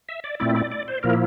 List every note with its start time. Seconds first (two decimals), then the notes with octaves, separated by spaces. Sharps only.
0.09 E5
0.24 D5
0.40 A#2 A3 C4 E4 D5
0.56 D5
0.72 D5
0.88 C5
1.03 A#2 F3 A#3 E4 A#4